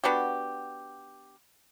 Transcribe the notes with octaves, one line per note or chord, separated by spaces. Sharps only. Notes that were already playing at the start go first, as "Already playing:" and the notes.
B3 D4 F#4 G4